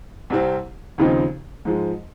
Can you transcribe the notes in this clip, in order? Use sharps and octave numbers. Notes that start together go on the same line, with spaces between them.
C2 C3 G3 C4
D#2 C#3 F3 C4 D#4
G#2 F3 G#3